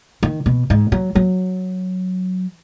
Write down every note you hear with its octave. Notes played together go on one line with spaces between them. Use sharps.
D#3
B2
G#2
F#3
F#3